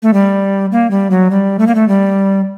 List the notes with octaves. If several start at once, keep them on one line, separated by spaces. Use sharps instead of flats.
A3
G3
A#3
G3
F#3
G3
A3
A#3
A3
G3